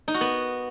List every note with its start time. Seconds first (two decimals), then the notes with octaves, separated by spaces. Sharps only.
0.08 D#4
0.14 F#4
0.21 B3